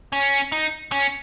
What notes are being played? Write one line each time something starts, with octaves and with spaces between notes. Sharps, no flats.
C#4
D#4
C#4